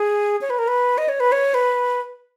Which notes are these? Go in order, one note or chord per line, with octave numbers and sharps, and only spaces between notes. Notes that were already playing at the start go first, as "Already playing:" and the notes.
Already playing: G#4
C#5
B4
A#4
B4
D#5
C#5
B4
C#5
B4